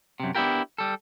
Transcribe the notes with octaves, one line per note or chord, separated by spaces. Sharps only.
F#2 C3
B3 D4 E4 F4 G4 A#4
G3 A4